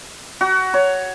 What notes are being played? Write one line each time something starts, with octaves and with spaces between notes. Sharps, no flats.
F#4
C#5